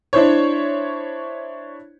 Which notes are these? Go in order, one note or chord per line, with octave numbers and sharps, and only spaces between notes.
D4 E4 C5 C#5